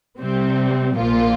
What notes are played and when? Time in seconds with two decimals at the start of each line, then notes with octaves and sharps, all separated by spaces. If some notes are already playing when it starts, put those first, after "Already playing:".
0.19 C3 G3 C4
0.96 A#1 A#2 F3 A#3 F4